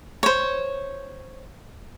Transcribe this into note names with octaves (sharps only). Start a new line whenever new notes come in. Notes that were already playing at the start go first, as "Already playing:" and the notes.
C5 C#5